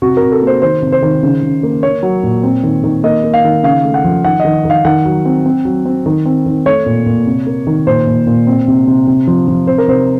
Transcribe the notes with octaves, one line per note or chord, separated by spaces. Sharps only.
C3 F#4
A#4
C3
A4
A#3
C5
D#3 C5
C3
C5
D#3
C#3
C#3
A#3
A#3 C#5
F#3
A#2
C4
D#3
D#3
A#3 D#5
A#3
F5
D#3
C#3 F5
A3
F#5
F3
D#3 F#5
D#5
D#3
D#3 F5
D#3 F#5
F#3
C4
C4
F#3
C4
D#3
C4
D#3
A3 C#5
A#2
A#2
C3
A#3
D#3
A#2 C5
A#2
A#2
C4
C3
C3
C3
F3
F3
C3 C5
A#4
C3 C5